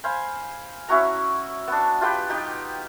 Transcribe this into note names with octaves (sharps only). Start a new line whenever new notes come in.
C5 F5 G#5 B5
C#4 E4 F#4 A#5
B3 D4
F4 G4 B4 G5
D#4 G4